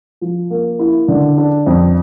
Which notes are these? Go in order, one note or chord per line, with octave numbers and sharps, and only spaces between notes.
F3
A#3
E4
D3
D4
F2